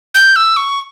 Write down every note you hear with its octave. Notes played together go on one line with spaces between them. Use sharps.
G6
E6
C#6